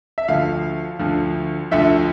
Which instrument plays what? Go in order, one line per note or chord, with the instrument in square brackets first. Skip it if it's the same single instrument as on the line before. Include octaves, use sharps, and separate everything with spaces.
[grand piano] E5
D2 D3 F3 F5
D2 D3 F3
D2 D3 F3 E5